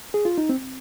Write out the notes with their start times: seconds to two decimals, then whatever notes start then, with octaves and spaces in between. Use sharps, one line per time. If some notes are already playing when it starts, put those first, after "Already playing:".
0.14 G#4
0.25 F4
0.38 D#4
0.49 C4